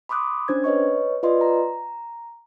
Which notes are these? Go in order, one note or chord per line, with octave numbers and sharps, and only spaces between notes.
B5 C6 D6 D#6 F#6
C#4 D4 C5 G#6
B4 C#5 D#5 C#6
F4 B4 D5 D#5 C6
A#5